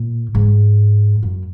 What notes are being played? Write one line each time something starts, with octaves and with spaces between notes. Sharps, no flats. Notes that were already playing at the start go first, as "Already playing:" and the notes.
Already playing: A#2
G#2
F#2